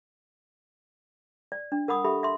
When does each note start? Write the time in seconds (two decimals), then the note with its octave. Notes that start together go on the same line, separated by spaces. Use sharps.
1.52 D5
1.72 D4
1.88 A#4 F#5 B5 D#6
2.04 G4 A4 E5 B5
2.23 E5 C6